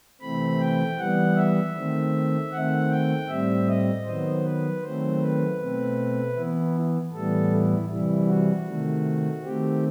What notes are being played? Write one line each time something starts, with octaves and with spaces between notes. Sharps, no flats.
C3 E3 A3 C4 B5
G5
E3 G3 B3 F#5
E5
D#3 A3 C4
D#3 A3 C4 F#5
G5
A2 G3 C4 E5
D#5
D#3 F#3 B3 C5
B4
D#3 F#3 A3 C4 C5
B4
B2 A3 C4
E3 B3 E4
A2 E3 G3 B3 A4
E4
C3 E3 G3 E4
F#4
C3 D#3 A3
D#3 A3 C4 G4